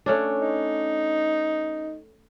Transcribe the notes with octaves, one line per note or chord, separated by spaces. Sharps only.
A3 C#4 D4
D#4